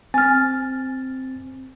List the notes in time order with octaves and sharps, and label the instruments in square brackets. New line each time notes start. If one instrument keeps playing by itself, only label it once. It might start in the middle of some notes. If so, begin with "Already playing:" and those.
[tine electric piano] C4 A6 [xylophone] G#5 F6